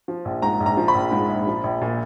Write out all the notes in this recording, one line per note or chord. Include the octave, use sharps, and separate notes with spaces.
F3
A#1
G#2 A#5
A#1
A#5
F3
B5
A#1
G#2
A#1
F3
A#1
A#2